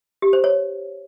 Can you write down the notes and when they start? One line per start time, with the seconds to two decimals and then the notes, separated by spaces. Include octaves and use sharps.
0.22 G4
0.33 C5
0.44 C#5